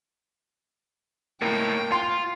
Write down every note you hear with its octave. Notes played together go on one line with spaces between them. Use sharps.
C#2 A2 A#3 G5
F4 C6